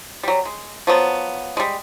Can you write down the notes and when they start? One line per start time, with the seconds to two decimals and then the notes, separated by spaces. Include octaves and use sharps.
0.23 F#3 G3
0.45 G#3
0.87 F3 F#3 B3
1.57 G3 G#3